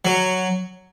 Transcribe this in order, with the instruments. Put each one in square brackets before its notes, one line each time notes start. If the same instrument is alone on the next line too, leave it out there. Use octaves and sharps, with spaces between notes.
[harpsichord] F#3